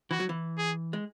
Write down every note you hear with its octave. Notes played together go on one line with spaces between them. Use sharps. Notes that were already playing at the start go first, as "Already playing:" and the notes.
E3 F#4
F#3
E3
G#4
G#3